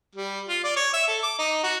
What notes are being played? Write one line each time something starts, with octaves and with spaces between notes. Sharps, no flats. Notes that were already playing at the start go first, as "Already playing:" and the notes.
G3
F4
D5
C#5
E5
A4
D6
D#4
F#4